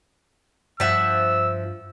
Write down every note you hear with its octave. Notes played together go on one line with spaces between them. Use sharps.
G2 F3 E5 F#5 E6